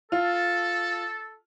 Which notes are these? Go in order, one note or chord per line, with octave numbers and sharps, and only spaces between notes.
F4 A4